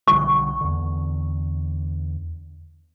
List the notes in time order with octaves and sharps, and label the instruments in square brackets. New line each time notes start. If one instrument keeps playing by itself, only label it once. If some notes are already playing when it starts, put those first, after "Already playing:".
[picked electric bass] B1 D3 G3 [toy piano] C#6
[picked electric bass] E2 D3